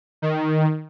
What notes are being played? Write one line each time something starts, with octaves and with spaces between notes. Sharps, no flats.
D#3